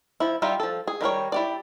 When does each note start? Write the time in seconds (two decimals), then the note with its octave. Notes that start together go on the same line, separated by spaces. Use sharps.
0.20 F3 E4
0.42 G3 D#4 F4 G4 E5
0.60 F3 A4
0.88 G#4
1.01 D#3 G3 A#4 C#5
1.32 E4 G4 D5